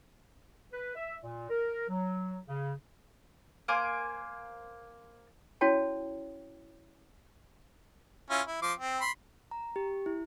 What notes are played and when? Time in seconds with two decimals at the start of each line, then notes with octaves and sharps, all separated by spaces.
0.72 B4
0.96 E5
1.22 A#2
1.50 A#4
1.89 F#3
2.47 C#3
3.68 A#3 C5 G#5 D6
5.61 C#4 E4 F#4 C#5 G5 A5
8.30 C#4 E4 F4
8.47 E4
8.62 F3 C6 D6
8.79 C4
9.01 B5 C6
9.51 A#5
9.76 G4
10.06 E4